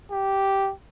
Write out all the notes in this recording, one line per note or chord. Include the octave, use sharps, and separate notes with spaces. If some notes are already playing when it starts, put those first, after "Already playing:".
G4